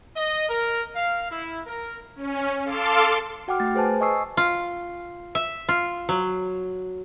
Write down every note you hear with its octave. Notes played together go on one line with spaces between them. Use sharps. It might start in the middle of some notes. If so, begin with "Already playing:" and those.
D#5
A#4
F5
E4
A#4
C#4
A4 F5 A5 C6 D6
F#4 F#5 G5 D6 F6
A3 A6
G#4 B4 C5 G#5 A5
D#5 G#5 C#6 D#6 E6 C7
F4
E5
F4
F#3